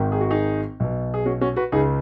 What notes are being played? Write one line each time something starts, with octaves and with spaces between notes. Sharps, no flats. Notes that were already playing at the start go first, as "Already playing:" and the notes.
Already playing: G#1 G#2 D#3
G#4
F#4
D#4 G#4
B1 B2
G#4
C#4 F#4
C#4 F#4
F#4 B4
C#2 C#3 D#4 G#4